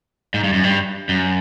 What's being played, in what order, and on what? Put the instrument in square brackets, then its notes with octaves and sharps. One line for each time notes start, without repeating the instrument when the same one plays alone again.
[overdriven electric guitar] G#2
G2
F#2
G2
F#2